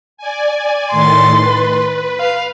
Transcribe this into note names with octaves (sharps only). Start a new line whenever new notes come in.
D5 G#5
A2 D#3 C6 A6
B4
F5